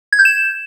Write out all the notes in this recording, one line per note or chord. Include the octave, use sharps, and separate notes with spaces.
G#6
G6
E7